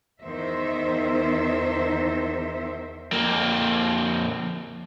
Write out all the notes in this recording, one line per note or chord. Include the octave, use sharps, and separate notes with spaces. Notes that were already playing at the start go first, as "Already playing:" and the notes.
E2 D#3 C5 E5
F2 A#3